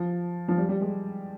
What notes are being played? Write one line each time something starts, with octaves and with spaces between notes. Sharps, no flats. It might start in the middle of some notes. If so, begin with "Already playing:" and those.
Already playing: F3
F3
G3
G3
G#3